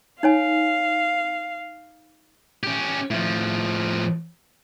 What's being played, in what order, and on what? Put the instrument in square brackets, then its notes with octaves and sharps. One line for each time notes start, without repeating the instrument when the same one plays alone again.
[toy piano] D#4 C#5 G#5 [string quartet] F5
[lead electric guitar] C#4 G4
A2 F3